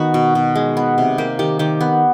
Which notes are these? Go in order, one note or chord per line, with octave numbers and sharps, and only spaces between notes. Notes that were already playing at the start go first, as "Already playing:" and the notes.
Already playing: D#3 B3 F#4
B2
B2
G#3
B3
C3
A#3 G4
D#3 G4
D#3 G4
B3